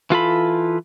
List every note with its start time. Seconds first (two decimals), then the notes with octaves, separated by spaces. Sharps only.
0.10 E3 F4 A4 B5